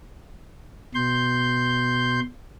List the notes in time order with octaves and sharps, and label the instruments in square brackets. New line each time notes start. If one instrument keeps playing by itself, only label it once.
[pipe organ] B2 C6 G6